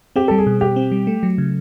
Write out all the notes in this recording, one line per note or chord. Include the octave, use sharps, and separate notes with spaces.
C4 G4
G3 A4
G#4
B2
B2 G4
C4
G3
A3
F#3
C#3